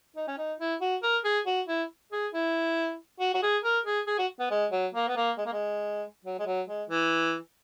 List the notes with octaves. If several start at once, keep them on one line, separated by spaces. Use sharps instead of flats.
D#4
C#4
D#4
E4
F#4
A#4
G#4
F#4
E4
G#4
E4
F#4
F#4
G#4
A#4
G#4
G#4
F#4
B3
G#3
F#3
A#3
B3
A#3
G#3
A#3
G#3
F#3
G#3
F#3
G#3
E3